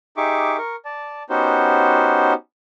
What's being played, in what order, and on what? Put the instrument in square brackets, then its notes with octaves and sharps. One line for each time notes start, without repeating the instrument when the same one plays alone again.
[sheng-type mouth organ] D#4 G4 G#4 E5 C#6 D6
A#4 C#6
D5 A5
B3 C#4 D#4 F#4 G4 C5